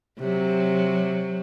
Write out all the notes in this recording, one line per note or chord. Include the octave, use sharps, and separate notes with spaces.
C3 F#3